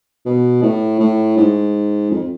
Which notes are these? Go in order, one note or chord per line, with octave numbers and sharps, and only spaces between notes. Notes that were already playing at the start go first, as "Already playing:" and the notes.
B2
A2
A2
G#2
F2